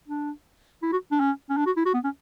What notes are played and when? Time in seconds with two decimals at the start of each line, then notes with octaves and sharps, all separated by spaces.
0.08 D4
0.82 E4
0.92 F#4
1.11 D4
1.20 C#4
1.49 C#4
1.57 D4
1.66 F#4
1.76 E4
1.86 F#4
1.94 B3
2.04 C#4